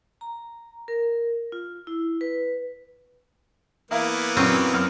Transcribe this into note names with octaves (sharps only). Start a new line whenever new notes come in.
A#5
A#4
F4
E4
B4
E3 A#3 B3 E4 A#4 F5
F#2 A#2 F#3 C4 C#4
F#2 F6